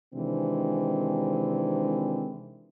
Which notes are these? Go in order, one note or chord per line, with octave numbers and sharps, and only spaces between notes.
C3 D#3 E3 G#3 C4 D4